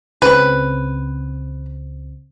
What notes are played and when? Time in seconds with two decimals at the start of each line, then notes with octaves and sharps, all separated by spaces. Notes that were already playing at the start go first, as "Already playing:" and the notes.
0.22 C#2 C#3 C4 B4